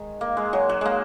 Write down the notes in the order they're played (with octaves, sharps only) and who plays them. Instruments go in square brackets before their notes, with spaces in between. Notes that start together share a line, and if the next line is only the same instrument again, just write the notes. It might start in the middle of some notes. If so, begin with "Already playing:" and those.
Already playing: [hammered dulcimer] D#3 G#3
A#3
G#3
F#3
F#3
G#3 A#3